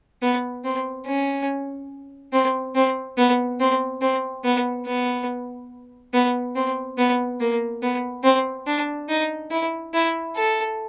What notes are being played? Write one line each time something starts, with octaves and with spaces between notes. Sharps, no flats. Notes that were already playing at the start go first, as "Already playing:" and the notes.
B3
C4
C#4
C4
C4
B3
C4
C4
B3
B3
B3
C4
B3
A#3
B3
C4
D4
D#4
E4
E4
A4